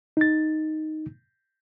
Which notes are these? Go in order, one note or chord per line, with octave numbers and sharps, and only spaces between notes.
D#4 A6